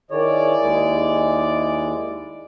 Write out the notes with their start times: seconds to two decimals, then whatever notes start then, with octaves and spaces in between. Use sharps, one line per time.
0.11 D#3 E4 G#4 C#5 D5
0.62 D#2 G#3